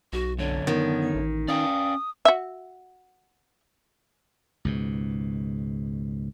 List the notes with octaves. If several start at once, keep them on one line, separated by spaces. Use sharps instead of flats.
B1 F#4
F#2 D3 D4 C#5
D#3 B3
A1
C#4 D5 F5 G5 D#6
F#4 E5
C#2 G#2 B2